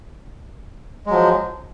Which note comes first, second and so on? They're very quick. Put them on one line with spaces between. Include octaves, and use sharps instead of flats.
G#3 F#3 F3